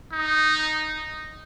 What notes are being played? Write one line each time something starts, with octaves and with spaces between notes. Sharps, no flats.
D#4